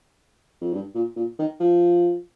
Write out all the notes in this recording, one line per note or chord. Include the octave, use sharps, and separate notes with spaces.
F2
G2
A#2
A#2
D#3
F3